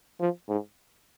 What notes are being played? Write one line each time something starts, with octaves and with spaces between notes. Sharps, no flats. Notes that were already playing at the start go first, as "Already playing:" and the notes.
F3
G#2